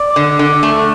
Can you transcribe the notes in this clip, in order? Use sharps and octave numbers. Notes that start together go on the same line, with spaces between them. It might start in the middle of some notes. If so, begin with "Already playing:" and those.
Already playing: D5
D3
D3
A3